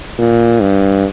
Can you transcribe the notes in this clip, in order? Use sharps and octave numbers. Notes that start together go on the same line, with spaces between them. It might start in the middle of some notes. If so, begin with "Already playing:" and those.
A#2
G2